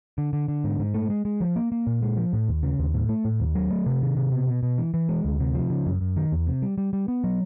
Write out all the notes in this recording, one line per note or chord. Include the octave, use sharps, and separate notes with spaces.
D3
D3
D3
G#2
G#2
A3
G#3
G#3
F3
A#3
A#3
A#2
G#3
F3
A2
D#2
C#3
D#2
A2
A3
A2
D#2
F#3
A3
C3
D#3
C3
B2
B2
B2
E3
E3
G#3
D2
C3
F3
C#3
F#2
F#2
D#3
E2
C3
G3
G3
G3
B3
F#3